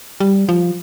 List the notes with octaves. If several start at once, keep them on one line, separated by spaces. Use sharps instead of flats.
G3
F3